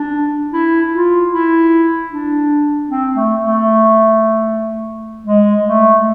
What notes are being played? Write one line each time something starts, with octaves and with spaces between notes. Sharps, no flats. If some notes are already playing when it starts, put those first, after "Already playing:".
Already playing: D4
E4
F4
E4
D4
C4
A3
A3
G#3
A3